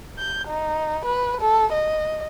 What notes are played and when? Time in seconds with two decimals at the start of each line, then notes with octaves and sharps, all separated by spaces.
0.18 G6
0.48 D#4
1.05 B4
1.41 A4
1.73 D#5